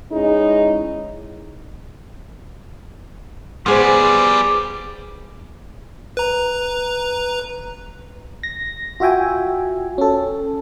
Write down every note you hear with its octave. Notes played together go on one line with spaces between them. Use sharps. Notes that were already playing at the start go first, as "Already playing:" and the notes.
G#3 C#4 D#4 E4 G#4
F3 G3 B3 G#4 C5
B4 A#5
A#6
F4 F#4 E5 G5 G#5
C#4 A4